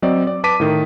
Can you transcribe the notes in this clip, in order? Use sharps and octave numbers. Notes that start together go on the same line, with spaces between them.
F#3 C4 D5 D#5
D5
B4 A5 D6 B6 D#7
A2 D#3